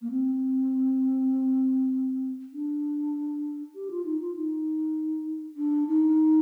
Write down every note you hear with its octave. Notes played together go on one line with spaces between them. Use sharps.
A#3
C4
D4
G4
F4
D#4
F4
D#4
D4
D#4